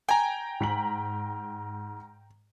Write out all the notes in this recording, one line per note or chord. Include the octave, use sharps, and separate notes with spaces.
G5 G#5 A#5
G#2 B6 F#7